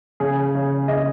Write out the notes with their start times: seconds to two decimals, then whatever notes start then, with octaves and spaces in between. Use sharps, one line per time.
0.20 C#3 G#4
0.55 C#3
0.88 C#3 D#5